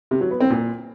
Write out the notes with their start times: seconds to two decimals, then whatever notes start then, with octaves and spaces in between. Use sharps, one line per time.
0.11 C3
0.21 F#3
0.31 B3
0.40 C4
0.50 A#2